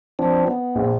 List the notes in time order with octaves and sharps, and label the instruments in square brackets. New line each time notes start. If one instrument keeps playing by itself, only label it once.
[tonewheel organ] F3 C4 D4
B3
[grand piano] A#1